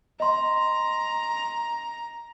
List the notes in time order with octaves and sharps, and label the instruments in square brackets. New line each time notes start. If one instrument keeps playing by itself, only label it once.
[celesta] D#5 C6 [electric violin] A#5